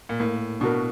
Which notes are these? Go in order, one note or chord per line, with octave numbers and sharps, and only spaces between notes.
A#2
A2 A#3
B2 D4 F#4 A#4